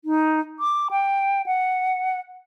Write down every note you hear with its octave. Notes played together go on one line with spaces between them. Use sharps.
D#4
D6
G5
F#5